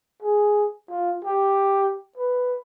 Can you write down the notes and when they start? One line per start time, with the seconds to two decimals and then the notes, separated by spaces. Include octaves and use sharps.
0.23 G#4
0.90 F4
1.25 G4
2.18 B4